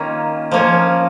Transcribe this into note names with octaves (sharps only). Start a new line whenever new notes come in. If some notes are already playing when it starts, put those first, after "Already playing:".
Already playing: D#3 A#3 C#4 F4
F3 A#3 C#4